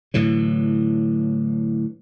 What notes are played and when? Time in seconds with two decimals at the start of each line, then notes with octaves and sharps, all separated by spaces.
0.14 A2 D3 E3 F#3